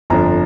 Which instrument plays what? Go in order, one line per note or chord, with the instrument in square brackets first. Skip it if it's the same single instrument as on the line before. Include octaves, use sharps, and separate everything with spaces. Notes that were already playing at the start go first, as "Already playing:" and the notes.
[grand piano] G1 F2 F3 D4 A#5